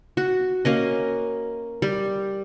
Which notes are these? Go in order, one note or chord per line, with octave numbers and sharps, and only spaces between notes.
F#4
A#3 C#4 D#5
G3